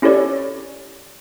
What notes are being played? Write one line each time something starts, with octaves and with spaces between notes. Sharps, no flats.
C#4 E4 G4 A4 C#5 D5